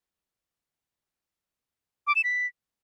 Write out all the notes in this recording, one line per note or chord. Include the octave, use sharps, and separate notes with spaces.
D6
E7
B6